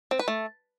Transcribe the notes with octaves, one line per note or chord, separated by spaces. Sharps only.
C4
B4
A3